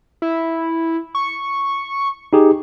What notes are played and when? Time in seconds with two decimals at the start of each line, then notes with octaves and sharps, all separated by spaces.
0.22 E4
1.15 C#6
2.33 D#4 G4 G#4